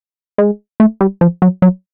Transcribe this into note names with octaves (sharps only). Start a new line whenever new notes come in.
G#3
A3
G3
F3
F#3
F#3